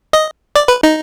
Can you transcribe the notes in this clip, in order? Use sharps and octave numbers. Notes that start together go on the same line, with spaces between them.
D#5
D5
B4
D#4